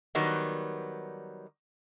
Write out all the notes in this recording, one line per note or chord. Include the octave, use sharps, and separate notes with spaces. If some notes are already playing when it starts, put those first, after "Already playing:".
D#3 F#3 G3 B3